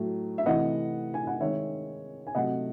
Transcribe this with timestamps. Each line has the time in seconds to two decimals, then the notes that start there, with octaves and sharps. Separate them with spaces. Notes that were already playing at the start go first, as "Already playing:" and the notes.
Already playing: A2 F#3 A3
0.38 E5
0.46 C3 E3 A3 D#5 F#5
1.14 G#5
1.27 F#5
1.41 D#3 G#3 C#5 E5
2.27 G#5
2.35 C3 F#3 A3 D#5 F#5